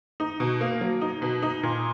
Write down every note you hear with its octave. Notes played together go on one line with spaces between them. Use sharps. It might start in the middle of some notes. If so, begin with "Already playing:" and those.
D#4
B2
A#3
F#3
D#4
B2
D#4
A#2